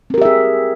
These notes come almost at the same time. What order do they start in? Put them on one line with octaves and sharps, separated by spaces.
C4 A#4 G4 E5 G#4